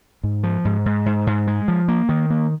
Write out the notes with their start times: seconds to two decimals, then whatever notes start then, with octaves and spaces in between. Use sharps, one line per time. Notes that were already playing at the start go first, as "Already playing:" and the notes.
0.23 G#2
0.43 F3
0.65 G#2
0.86 G#2
1.06 G#2
1.27 G#2
1.47 G#3
1.68 F3
1.88 A#3
2.09 D#3
2.30 A#3